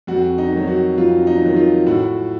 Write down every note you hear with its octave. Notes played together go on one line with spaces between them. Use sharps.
F2 F#4
D#4
D#3 F#3
F#4
F2 F4
D#4
D#3 F#3
F4
A2 F#4